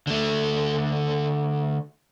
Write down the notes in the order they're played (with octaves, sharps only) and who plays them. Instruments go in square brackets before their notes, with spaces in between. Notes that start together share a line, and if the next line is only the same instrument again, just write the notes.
[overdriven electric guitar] D3 A3